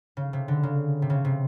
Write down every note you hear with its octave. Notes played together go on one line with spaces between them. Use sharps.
C#3
C3
D3
C#3
C3
C#3
C3